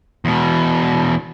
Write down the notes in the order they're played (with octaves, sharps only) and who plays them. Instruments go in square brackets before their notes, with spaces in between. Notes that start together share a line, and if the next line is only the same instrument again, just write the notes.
[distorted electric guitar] E2 B2